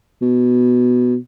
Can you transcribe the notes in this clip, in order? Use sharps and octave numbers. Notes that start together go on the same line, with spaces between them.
B2